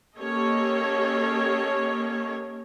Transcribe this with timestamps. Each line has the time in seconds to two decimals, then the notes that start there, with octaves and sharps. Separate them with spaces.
0.16 A#3 C#4 G4 A4 C#5 D#5